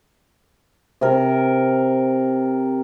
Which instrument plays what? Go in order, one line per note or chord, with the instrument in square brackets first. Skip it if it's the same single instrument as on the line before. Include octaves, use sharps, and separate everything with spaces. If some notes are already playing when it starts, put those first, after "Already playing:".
[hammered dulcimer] C3 A#4